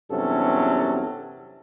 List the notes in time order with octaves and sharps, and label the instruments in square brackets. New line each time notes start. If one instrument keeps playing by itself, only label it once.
[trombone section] E2 G2 C3 F#3 C#4 A4